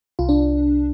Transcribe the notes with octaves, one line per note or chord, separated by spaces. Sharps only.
C2 F4
D4